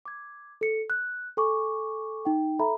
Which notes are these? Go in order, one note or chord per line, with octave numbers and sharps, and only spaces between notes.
D6 G#6
A4 C#7
F#6
A4 G#5 C#6 D6
D#4 G5
A4 E5 A#5 B5